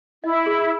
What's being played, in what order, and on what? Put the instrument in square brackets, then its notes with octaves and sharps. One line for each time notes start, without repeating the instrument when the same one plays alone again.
[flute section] E4 [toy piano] D#5
[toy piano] G#4